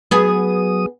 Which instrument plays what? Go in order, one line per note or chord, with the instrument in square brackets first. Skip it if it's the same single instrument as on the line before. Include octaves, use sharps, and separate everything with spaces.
[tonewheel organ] F#3 D#6 [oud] B3 G#4